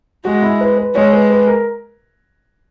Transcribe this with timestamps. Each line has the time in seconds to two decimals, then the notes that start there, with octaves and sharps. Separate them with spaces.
0.25 G#3 F#4
0.43 E4
0.61 B4
0.78 B4
0.95 G#3 C#5
1.13 B4
1.30 B4
1.47 A#4